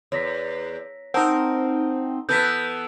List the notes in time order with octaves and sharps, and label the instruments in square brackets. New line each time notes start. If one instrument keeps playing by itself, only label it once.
[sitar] E2 [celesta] C#5 A#6 B6
[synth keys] C4 D#4 [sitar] A#4 [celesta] F#5 A5 D#6
[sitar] E3 B3 A4 [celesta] G6 B6